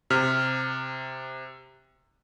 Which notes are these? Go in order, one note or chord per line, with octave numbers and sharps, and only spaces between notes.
C3 F6